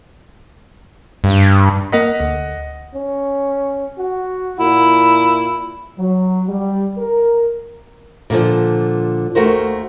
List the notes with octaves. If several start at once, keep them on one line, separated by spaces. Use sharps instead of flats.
G2
A#3 A#4 D#5 F#5 B6
D2
C#4
F#4
A#2 E4
F#3
G3
A#4
A#2 D3 D#3 F3
D#2 A#2 A3 F#4 A#4 C5